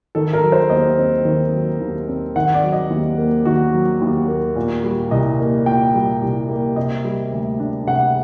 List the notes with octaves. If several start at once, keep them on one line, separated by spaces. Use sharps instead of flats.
D#3 A4
A#4
F#3
C5
D#2 D#5
C4
D#3
F#3
D#2
C4
D#3 F#5
D5
F#3
D#5
D#2
A#3
D#3 F#4
F#3
D#2
A#3
A#2
G3
C2 D#5
A#3
A#2 G5
G3
C2
A#3
C3 D#5
G3
D2
D4
C3 F#5